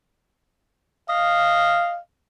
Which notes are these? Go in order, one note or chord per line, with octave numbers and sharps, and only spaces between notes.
D#5 F5